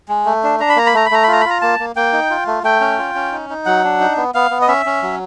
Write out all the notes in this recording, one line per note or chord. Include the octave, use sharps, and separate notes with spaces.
G#3
A3
D4
D4 A#5
B5
A#3 A#5
B5
A3 A#5
B5
A3 A#5
B5
F4 A#5
B5
F4 A#5
A#3 A5
A#3
A#3 G5
D#4
F4
A3
A3 G5
C#4
F4
C#4
D#4
D#4
F#3 F#5
D4
D#4
B3
B3 F5
B3
D#5
C#4 E5
C#4
F#3